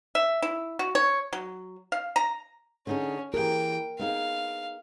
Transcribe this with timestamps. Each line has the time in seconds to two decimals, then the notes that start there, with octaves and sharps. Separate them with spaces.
0.15 E5
0.42 E4
0.79 F#4
0.95 C#5
1.33 F#3
1.92 F5
2.16 A#5
2.87 D3 C#4 D#4 G#4
3.34 E3 G4 G#4 A#4 G5
3.99 B3 D#4 G#4 F5